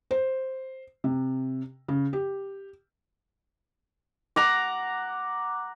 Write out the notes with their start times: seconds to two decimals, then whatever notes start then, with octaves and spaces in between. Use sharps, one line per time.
0.11 C5
1.04 C3
1.88 C#3
2.13 G4
4.36 F#5 A#5 D6